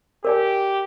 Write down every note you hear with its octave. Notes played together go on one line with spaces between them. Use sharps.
G4 A#4 D5 G#5